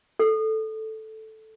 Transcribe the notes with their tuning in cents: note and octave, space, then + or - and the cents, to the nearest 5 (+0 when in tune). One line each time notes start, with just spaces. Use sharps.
A4 -5